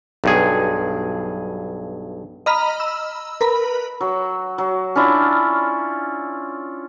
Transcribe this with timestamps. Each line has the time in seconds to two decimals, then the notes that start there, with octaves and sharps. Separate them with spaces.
0.24 B1 G2 G#4
2.46 D#5 A#5 B5 F6
2.80 E6
3.41 A#4 B4 B5
4.01 F#3
4.58 F#3
4.96 C#4 D4 E4 F4